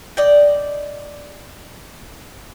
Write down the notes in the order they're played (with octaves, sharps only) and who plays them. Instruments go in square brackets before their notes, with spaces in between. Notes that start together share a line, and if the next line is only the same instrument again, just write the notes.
[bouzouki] D5 D#5 G5